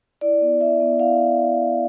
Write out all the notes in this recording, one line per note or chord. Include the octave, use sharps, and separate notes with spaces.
E4 D5
B3
E4 E5
B3
E4 F5